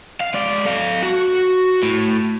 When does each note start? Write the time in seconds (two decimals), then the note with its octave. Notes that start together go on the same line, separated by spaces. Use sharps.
0.20 F5
0.34 G#3 D5
0.66 A4 F5
1.03 F#4
1.83 A2